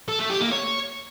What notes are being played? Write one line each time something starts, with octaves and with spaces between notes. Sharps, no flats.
A4
A3
G4
A#3
C#5